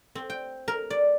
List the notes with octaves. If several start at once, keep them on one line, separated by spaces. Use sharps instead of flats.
C4
G5
A#4
D5